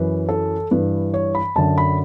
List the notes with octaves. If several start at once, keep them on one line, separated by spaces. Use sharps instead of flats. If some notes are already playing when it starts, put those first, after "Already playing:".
Already playing: F#2 E3 B4
A4
G2 E3 B4
C#5
B5
F#2 D3 A5
B5